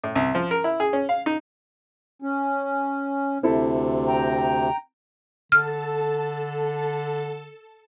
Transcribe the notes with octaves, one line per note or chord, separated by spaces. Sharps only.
A2
C2
F3
A#4
E4
G#4
C#4
F5
D#4
C#4
D2 C3 C4 E4 A4
G5 A#5
D3 A4 A5 F6